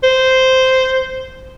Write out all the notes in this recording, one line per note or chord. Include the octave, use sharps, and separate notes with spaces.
C5